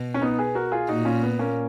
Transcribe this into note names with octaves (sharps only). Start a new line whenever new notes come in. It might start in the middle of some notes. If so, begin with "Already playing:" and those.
Already playing: B2
C#4
B3 D#4
G#4 B4
F#4 A#4
F4 G#4
A#2 D#4 F#4
C#4 F4
B3
A#3 C#4